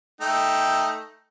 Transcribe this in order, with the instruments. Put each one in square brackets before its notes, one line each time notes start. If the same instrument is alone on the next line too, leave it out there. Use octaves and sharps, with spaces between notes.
[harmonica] A3 D#4 G5